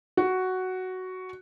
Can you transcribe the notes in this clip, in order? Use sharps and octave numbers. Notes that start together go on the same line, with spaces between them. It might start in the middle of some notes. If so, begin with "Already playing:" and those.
F#4